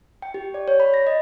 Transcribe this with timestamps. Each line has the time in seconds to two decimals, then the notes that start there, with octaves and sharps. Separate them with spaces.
0.22 G5
0.34 G4
0.54 D5
0.68 C#5
0.80 B5
0.94 A#6
1.07 D#5